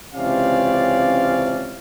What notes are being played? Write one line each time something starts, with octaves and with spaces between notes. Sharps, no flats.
C#2 C3 E3 C#4 D5 F5